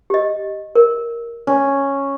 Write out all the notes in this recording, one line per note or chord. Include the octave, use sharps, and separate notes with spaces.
G4 D#5
A#4
C#4